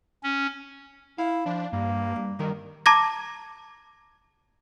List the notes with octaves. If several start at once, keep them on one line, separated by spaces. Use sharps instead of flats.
C#4
E4 F5
F3 D4
G2 A#3
G2
G2 D#3 A#4
A5 A#5 D6 G#6 A#6